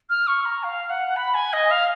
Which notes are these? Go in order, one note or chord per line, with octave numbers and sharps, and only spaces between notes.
F6
C#6
A#5
F5
F#5
B5
G#5
D#5
F5